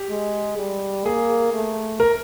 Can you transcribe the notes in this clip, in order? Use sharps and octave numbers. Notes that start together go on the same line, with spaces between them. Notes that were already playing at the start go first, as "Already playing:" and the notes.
Already playing: G4
G#3
G3
A#3 G#4
A3
A#4